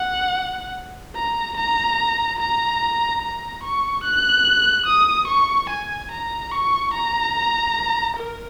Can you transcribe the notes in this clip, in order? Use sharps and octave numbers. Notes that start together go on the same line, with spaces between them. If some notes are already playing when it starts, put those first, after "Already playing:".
Already playing: F#5
A#5
A#5
A#5
A#5
C#6
F#6
D#6
C#6
G#5
A#5
C#6
A#5
A#4